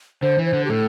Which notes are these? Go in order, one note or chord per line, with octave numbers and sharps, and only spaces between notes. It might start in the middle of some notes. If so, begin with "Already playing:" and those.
D3 C5
E3
C5
D3
G4
A2 A4